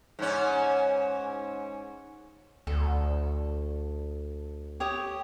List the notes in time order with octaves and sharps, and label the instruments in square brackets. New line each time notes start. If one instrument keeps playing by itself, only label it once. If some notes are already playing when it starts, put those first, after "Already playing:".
[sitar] G#2 C#4
[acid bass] D2 [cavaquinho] A4
[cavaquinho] G4 C#5 D#6